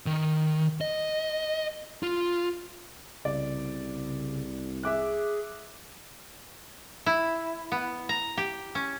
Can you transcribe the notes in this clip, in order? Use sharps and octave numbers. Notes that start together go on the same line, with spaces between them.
D#3
D#5
F4
C2 C#3 D5
G#4 E5 D6 F#6
E4
B3
A#5
G4
C#4